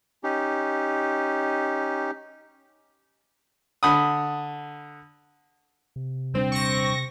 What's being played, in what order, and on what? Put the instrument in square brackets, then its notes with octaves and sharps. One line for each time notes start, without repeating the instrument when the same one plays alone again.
[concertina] C#4 D#4 G4
[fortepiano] D3 B5 D#6
[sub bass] C3
[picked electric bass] D#1 G3 D4 [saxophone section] C4
[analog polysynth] C#6 A#6